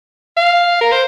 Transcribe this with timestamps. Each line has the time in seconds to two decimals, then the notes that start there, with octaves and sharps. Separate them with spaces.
0.37 F5
0.81 A#4
0.92 C5